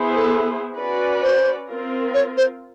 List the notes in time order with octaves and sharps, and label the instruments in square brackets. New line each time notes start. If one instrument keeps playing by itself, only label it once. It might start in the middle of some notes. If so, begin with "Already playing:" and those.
Already playing: [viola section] B3 E4 G#4 C5
[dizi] A4
[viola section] C#4 F#4 B4 D5
[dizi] C5
[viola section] C4 F4 A#4
[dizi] C#5
C5